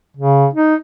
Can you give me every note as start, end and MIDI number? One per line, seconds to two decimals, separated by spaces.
0.17 0.46 49
0.53 0.75 63